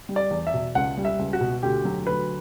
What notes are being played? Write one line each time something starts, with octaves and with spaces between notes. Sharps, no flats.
G3
D5
E2
E5
B2
C#2 F#5
G3
E5
C#2
F#4
B2
D2 G4
F#3
D2 B4